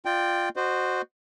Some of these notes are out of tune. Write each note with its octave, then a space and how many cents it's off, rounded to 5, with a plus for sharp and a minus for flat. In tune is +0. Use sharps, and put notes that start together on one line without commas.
F4 +0 D5 +40 G5 +0
F#4 +0 C5 -5 D#5 -35